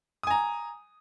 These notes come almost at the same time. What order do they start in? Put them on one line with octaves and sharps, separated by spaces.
D#6 G#5 A#5